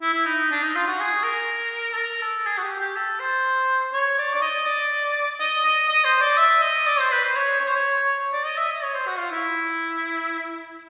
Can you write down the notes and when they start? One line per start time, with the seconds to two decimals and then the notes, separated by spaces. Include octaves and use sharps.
0.02 E4
0.14 E4
0.25 D#4
0.51 D4
0.62 D#4
0.75 F4
0.87 F#4
1.00 G#4
1.23 A#4
1.93 A4
1.97 A#4
2.21 A4
2.46 G#4
2.58 F#4
2.63 G4
2.79 G4
2.96 A4
3.20 C5
3.93 C#5
4.18 D5
4.34 D5
4.42 D#5
4.66 D5
5.40 D#5
5.64 D#5
5.89 D#5
6.04 C5
6.21 D5
6.37 E5
6.62 D#5
6.87 D5
6.99 C5
7.11 B4
7.24 C5
7.35 C#5
7.60 C#5
7.68 C5
7.75 C#5
8.33 D5
8.45 D#5
8.57 E5
8.70 D#5
8.83 C#5
8.95 C5
9.07 F#4
9.18 F4
9.31 E4